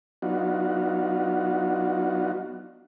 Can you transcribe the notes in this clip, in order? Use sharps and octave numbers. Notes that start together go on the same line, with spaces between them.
F#3 B3 D4 D#4 F4 F#4